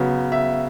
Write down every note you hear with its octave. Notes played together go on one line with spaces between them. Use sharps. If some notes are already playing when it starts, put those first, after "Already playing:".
Already playing: C#3 F#3 B3
E5